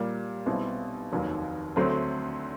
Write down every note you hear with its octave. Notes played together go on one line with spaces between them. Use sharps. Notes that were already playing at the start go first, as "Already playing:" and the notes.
Already playing: A#2 G3 A#3
B1 B2 G3 C4 E4
F1 D#2 D#3 F#3
D2 D3 F#3 A3 C4